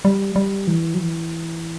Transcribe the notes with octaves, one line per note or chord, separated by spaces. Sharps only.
G3
G3
E3
F#3
E3